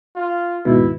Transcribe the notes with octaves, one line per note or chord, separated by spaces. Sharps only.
F4
D#2 G#2 B2 E4